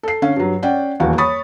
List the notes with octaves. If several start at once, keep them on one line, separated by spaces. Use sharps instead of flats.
A4 C7
D3 C#4 F5
G2 F#3
C#4 D5 F#5 G5
D#1 E2 F#4 F5
C#5 B5 C#6 D#6 A6